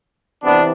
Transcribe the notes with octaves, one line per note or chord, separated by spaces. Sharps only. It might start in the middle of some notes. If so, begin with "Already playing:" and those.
C3 E3 B3 D4